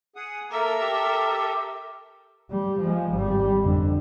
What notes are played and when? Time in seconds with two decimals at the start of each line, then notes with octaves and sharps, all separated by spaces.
0.16 G#4 F#5 D#6
0.51 A#3 A4 A#4 E5
0.81 G4
1.31 G4
2.50 G3
2.80 F3 G#3
3.12 G#1 G3
3.63 F2 D3